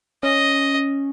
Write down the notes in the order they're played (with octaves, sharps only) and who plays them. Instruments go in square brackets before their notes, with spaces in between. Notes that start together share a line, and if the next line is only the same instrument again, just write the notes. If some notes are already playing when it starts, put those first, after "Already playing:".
[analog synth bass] C#4 [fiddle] D#5